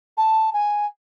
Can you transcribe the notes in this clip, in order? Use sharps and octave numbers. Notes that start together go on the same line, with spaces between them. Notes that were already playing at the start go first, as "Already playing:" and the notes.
A5
G#5